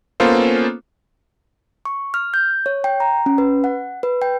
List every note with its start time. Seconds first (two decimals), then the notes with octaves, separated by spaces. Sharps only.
0.20 A#3 B3 C#4 F4 A4 C5
1.85 C#6
2.14 F6
2.34 G6
2.66 C#5
2.84 G5
3.00 A#5
3.26 C#4
3.38 B4
3.64 F#5
4.03 B4
4.22 G5